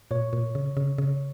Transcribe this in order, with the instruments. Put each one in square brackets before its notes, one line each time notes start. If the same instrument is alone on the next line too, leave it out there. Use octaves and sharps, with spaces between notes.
[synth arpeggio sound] A#2 [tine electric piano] C#5
[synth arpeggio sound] A#2
C#3
C#3
C#3